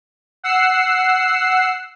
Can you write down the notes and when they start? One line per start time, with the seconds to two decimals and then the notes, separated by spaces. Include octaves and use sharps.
0.44 F#5 E6 C7